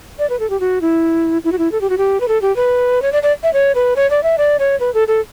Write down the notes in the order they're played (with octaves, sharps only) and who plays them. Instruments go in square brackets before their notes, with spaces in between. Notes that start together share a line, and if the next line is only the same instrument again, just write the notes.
[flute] D5
B4
A4
G4
F#4
E4
E4
F#4
E4
A4
G4
F#4
G4
B4
A4
G4
B4
C#5
D5
D5
E5
C#5
B4
C#5
D5
E5
D5
C#5
B4
A4
A4